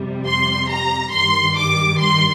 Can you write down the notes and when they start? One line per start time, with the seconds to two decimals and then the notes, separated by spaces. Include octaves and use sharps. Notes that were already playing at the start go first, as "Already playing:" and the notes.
Already playing: F2 C3 G3
0.26 C6
0.70 A#5
1.12 G2 D#3 G3 C6
1.56 D6
1.99 C6